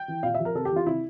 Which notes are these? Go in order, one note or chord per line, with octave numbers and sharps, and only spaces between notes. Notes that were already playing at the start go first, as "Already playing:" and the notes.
Already playing: G5
E3
A#2 F5
E5
F3
A#4
C3 A4
G4
E3
F4
C3 E4